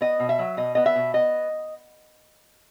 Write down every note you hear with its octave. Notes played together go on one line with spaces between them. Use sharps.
B3 D#5
B2
E5
F#3
B2 D#5
B3 D#5
E5
B2
B3 D#5